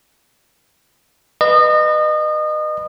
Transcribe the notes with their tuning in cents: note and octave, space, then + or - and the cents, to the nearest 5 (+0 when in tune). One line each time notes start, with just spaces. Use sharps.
B4 +0 D#5 -30